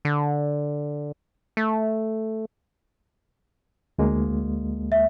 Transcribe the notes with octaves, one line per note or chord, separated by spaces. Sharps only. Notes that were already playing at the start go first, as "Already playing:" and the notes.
D3
A3
D2 G#3 A#3
E5